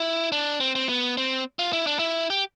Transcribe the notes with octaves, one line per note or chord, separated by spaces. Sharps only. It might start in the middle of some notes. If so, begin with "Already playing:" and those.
Already playing: E4
D4
C4
C4
B3
C4
F4
E4
D4
E4
G4